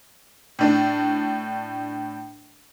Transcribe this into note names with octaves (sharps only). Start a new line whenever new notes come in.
A2 D4